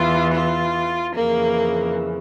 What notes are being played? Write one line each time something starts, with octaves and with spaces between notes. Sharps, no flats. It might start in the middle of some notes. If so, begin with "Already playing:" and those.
Already playing: E2 E3 F4
F4
F2 C#3 E3 A#3